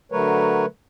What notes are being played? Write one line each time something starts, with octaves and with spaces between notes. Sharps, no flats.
D3 F#3 A3 A#4 B4 C#5